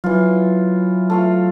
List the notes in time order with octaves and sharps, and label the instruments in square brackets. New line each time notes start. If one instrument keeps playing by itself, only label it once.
[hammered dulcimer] E3 F4 [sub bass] F#3
[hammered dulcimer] A3 F4 F5